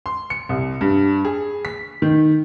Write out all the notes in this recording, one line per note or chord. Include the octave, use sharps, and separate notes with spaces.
C6
C#7
C2
G2
G#4
B6
D#3